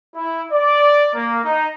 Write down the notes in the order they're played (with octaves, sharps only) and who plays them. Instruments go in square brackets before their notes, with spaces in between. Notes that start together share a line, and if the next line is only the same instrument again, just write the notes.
[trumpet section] E4
D5
A#3
D#4